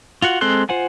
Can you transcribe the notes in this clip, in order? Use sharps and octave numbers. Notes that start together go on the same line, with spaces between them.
F4 F#4 F#5
G#3 C4 A4 C6 F#6
F4 C5 F#5 G#5